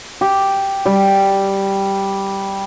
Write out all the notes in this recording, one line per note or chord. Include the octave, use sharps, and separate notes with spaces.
G4
G3